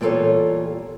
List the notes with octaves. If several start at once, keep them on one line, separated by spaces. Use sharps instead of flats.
E2 A#2 G3 F4 A4 C#5